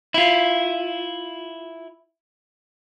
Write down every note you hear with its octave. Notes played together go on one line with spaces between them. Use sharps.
E4 F4